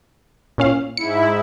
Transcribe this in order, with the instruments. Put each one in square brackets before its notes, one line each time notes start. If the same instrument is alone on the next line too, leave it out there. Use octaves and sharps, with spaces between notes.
[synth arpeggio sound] A#2 C#4 F5
[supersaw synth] G#2 E4 [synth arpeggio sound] C#7